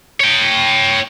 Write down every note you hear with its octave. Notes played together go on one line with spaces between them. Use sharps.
C#5 G5